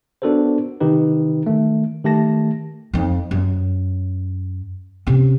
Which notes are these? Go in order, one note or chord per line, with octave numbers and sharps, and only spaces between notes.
B3 D4 F#4 A4 A#4 C5
C3 D#3 D#4 G4 B4
D#3 A3
D#3 A3 G4 A5 A#6
F2 D#4
F#2
C3 C#4